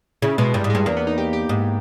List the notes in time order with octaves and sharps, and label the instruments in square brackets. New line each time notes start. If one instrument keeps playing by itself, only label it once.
[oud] C#3 [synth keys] E4
[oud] B2 [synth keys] G#3
[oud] G2 [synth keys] G3
[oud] G#2
[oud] G2 [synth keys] G#3
[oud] E2 [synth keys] A#3
[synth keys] B3
D#4
G4
G4
[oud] G#2